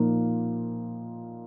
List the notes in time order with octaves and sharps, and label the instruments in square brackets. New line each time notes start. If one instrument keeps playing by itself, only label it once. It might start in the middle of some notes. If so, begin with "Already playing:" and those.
Already playing: [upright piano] A#2 F3 A#3 D#4